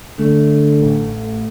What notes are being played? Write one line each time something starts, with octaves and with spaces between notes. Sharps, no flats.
D3 A3
A1